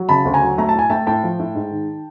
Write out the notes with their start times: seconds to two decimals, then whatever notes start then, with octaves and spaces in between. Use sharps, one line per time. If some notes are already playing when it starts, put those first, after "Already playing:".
Already playing: F#3
0.09 C#3 A5 B5
0.25 D2
0.34 G#5 A#5
0.42 F#3
0.58 A3 A#5
0.69 A5
0.75 A2 G#5
0.90 A3 G5 A5
1.07 A2 G5 A5
1.23 F3
1.39 A2
1.55 G#2
1.71 D#3